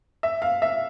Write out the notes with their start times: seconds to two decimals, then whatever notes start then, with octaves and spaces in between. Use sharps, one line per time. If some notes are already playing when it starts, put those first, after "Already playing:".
0.23 E5
0.42 F5
0.62 E5